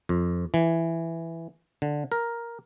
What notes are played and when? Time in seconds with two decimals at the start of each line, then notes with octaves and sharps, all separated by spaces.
0.09 F2
0.54 E3
1.82 D3
2.12 A#4